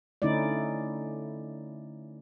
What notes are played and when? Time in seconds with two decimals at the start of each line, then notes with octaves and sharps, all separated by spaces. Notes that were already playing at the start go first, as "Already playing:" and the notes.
0.22 D3 A3 C#4 D#4 E4 D5